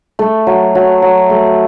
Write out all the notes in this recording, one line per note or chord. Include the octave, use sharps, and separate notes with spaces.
A3
F#3
F#3
F#3
A3